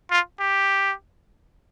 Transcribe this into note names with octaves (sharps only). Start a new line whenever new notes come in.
F4
G4